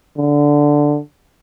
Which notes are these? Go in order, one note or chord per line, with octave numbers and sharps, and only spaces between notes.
D3